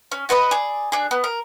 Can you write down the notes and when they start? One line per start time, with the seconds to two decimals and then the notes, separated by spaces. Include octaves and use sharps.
0.12 C#4
0.29 F#4 B4 C#5 D#5
0.51 G#4 D5
0.92 D4 G#4
1.11 B3
1.24 A#4